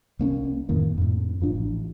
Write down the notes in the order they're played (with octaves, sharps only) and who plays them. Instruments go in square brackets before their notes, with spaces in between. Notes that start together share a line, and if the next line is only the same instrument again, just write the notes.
[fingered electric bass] C2 A#3 C#4
F2 A2 D#3 A#3
F2 A2
F#1 F3 D4
A1